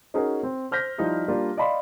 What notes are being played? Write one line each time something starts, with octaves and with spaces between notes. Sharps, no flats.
C#4 D#4 F#4 G#4 A#4
C4
C5 F6 G6 A#6 B6
F3 G3 D#4 E4 G4
G3 A#3 D4 F4
D5 D#5 F5 B5 C6